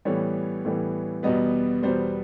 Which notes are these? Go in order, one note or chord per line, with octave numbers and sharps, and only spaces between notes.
A2 E3 G3 B3 C#5
A2 E3 G3 B3
E2 B2 G3 B3 D#5
E2 B2 G3 B3 C5